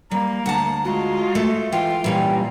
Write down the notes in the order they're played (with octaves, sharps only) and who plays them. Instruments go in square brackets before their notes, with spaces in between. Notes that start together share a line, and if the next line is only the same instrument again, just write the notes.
[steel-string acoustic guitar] G3 [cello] A#3 [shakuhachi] A#5
[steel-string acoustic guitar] D2 F#5 A5
[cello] G#3 F4 [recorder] F#4
[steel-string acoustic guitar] A3 A4 [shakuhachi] E5
[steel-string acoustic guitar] E3 [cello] F4 [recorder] G5
[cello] A#2 [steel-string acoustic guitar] E3 G3 C#4